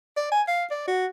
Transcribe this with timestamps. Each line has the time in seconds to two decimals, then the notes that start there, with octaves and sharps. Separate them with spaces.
0.17 D5
0.32 G#5
0.48 F5
0.71 D5
0.88 F#4